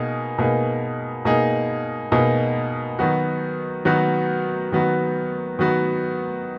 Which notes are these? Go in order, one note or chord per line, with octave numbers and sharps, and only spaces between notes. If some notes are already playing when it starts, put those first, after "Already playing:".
Already playing: B2 A#3 D#4 G#4
B2 A#3 D#4 G#4
B2 A#3 D#4 G#4
B2 A#3 D#4 G#4
D#3 F#3 B3 F#4
D#3 F#3 B3 F#4
D#3 F#3 B3 F#4
D#3 F#3 B3 F#4